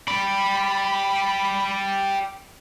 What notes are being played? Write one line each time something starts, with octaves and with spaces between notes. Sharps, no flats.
G4 D5 B5